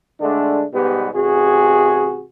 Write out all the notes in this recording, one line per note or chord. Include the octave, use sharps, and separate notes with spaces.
D3 G#3 A3 D4
G#2 B2 G3 B3 G4
A1 C3 F#4 G#4